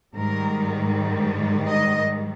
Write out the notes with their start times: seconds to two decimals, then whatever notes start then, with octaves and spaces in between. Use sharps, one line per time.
0.15 G#2 D#3 G3 A#4
1.68 D#5